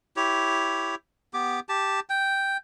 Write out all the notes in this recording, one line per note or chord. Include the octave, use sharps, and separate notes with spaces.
E4 G4 C#5
B3 G4 D6
G4 A5
G5